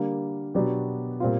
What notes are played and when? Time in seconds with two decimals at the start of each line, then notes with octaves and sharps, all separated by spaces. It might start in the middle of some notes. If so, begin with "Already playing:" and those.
Already playing: D3 G3 A#3
0.54 B2 F#3 B3 D4 G4
1.20 A#2 G3 C4 F4